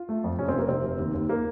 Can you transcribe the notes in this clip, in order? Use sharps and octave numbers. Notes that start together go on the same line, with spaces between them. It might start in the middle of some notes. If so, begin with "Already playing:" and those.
Already playing: F4
A3
F2
C3 C#4
C4
F1 A#3
C3 C4
F1
D#2
D#2
A#3